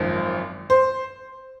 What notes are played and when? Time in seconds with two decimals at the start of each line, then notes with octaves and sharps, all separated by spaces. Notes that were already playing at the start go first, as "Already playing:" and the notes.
Already playing: G#1 F#2 F3
0.70 C5